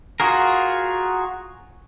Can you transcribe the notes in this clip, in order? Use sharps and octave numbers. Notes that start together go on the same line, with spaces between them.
F4 F#4 G#4 A#4